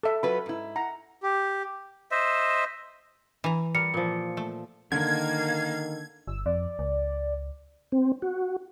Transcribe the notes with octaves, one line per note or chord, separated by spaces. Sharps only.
A4 E5
F#3 F4 B4 B5
G#2 E4
F#5 A#5
G4
C5 D#5 E5
E3 A#5
G3 A#4 C#7
A#2 F3
A3
D3 D#3 A#3 F5 G#6
G1 E6
F2 D5
C#2
C4
F#4